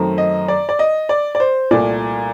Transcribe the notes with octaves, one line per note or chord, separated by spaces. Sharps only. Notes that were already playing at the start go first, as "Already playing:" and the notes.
Already playing: F#2 D#3 A3 C4
D#5
D5
D5
D#5
D5
D5
C5
C2 A#2 A3 D5